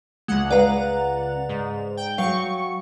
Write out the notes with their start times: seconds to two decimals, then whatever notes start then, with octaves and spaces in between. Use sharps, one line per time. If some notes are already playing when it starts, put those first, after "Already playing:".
0.28 C#2 G#3 F#5
0.51 B4 D5 F5 A#5
1.49 G#2
1.97 G5
2.18 F#3 F5 C#6